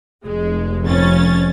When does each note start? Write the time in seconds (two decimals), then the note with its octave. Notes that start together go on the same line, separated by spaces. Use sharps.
0.24 F1 G#3
0.84 F2 C#4 A6